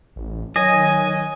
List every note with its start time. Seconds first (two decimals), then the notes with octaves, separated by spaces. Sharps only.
0.16 A1
0.56 D#3 F#3 D#5 G#5